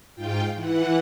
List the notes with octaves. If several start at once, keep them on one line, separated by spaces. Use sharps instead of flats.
G#2 F4 G5
E3 F#5